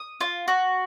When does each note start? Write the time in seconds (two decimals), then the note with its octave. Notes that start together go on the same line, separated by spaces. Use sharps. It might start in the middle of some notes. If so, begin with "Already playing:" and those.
Already playing: D#6
0.21 F4
0.48 F#4